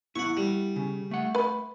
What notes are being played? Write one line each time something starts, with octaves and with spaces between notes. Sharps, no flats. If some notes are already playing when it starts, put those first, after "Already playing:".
B3 E4 F#5 C#6
G3
C#3
A3 F#5
B4 B5